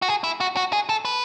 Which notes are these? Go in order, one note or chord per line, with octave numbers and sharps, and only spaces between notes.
F#4
G#4
E4
F#4
F#4
G#4
A4
B4